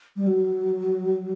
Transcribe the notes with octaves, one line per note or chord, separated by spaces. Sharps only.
G3
F#3